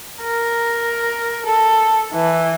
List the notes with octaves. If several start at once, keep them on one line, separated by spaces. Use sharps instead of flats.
A#4
A4
E3